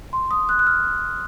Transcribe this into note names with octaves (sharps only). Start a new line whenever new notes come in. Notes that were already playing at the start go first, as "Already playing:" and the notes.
C6
D#6
F#6
F#6
F6